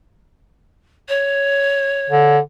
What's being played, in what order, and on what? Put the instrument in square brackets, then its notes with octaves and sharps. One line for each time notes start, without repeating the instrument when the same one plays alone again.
[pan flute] C#5
[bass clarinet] D3